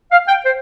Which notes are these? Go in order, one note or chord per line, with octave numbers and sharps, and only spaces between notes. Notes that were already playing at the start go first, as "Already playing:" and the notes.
F5
G5
C5